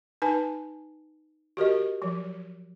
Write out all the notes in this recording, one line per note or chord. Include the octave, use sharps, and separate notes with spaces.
D#4 B4 G#5 A5
F#4 G4 A#4 D#5
F3 F#3